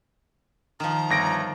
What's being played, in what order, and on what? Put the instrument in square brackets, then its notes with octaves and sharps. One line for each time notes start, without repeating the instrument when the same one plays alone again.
[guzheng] D#3 F3 [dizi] A#5
[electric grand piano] G1 A#6 D7